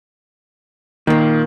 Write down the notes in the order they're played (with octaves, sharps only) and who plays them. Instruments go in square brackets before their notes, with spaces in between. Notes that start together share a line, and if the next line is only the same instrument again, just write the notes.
[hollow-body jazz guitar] A#2 A#3 [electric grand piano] D#3